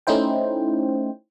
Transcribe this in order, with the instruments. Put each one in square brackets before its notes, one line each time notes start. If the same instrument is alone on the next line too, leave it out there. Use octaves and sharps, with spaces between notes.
[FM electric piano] A3 C#4 D#4 E4 C5 G5